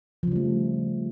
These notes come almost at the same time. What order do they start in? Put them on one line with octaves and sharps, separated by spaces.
F3 C#3 G3 A3